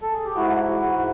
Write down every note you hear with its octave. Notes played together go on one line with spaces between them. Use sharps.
A4
G#4
G4
G#2 E4 F#4
E3
G#2